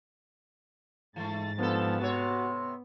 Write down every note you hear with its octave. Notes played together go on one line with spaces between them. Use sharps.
G#2 E3 A3 A6
G2 F3 B3 A4
C3 F#4 C#5